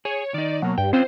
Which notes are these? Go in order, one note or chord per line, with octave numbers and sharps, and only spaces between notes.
G#4 C#5
D#3 D#4 D5
B2 F#3 A#3
G2 G5
C4 C#4 F4 C5 G5